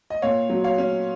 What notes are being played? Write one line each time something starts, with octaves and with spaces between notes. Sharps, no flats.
D#5
A#2 C#5 F5
F#3
C#5 F5
C#4